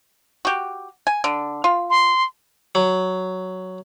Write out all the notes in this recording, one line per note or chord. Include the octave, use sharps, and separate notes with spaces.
F#4 G4
G#5
D3
F4
C6
F#3